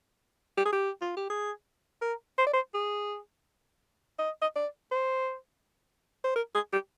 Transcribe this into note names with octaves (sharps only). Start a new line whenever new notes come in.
G4
G#4
G4
F4
G4
G#4
A#4
C5
D5
C5
G#4
D#5
D#5
D5
C5
C5
A#4
G#4
G4